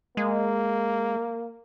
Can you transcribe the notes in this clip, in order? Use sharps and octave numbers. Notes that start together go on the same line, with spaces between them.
G#3 A#3